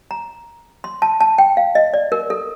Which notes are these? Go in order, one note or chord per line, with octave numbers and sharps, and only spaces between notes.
A#5
C6
A5
A5
G5
F5
D#5
D5
A#4
A4